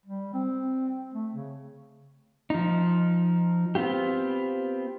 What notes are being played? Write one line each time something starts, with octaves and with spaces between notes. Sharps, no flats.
G3
C4
A3
C#3
F3 D#4
B3 C4 F4 G4